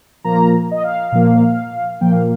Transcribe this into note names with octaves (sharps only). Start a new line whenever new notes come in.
A#2 F3 A#3 A#5
D#5
F5
A#2 F3 A#3
A#2 F3 A#3 G5
F5